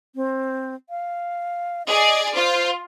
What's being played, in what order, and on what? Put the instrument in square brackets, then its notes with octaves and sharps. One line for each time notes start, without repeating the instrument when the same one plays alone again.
[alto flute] C4
F5
[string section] G#4 D5 [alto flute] D#5
[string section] F4 [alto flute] C5